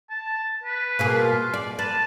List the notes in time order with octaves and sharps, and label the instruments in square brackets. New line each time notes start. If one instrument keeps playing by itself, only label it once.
[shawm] A5
B4
[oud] B2 A#3 G#4
[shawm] F4
[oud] D5
[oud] B4 [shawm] A5